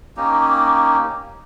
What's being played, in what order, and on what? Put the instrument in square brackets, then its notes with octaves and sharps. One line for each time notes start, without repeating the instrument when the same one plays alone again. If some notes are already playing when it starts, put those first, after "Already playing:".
[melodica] A#3 C#4 D#4 G4